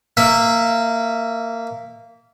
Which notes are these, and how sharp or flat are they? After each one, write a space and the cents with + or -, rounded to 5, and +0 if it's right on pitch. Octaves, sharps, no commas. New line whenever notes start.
A#3 -20 E5 +0